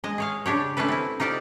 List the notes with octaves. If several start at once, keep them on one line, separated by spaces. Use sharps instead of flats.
G#3 D#5
G#4 C#5 F5
C#3 D4 G4 C#5
A3 C#4 D4 A4 B4
C4 E4
D#4 F4 G4 C5 D5